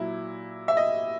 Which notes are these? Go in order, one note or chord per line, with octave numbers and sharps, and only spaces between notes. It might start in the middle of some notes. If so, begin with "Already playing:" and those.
Already playing: A#2 F#3 E4
E5
D#5